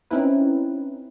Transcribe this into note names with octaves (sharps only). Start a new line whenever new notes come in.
C4 C#4 D#4 E4 B4